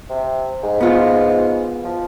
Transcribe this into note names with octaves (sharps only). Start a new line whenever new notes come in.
C3
G#2
B3 F4
F3